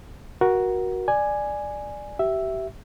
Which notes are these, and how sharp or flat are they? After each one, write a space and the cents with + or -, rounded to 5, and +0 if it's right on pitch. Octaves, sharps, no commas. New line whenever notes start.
F#4 +0 A#4 +25
D5 +15 G#5 +0
G4 -30 E5 +0